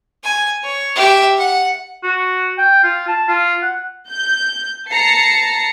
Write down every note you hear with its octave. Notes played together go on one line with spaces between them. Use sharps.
G#5
C#5
G4 E5
F#5
F#4
G5
F4
A5
F4
F#5
G6
A5 A#5 C7 C#7